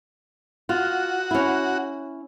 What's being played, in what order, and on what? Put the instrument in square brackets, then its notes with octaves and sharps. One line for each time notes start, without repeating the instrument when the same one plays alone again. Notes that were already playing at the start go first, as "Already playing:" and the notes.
[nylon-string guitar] F4 [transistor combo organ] F#4
[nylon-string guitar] C#4 E4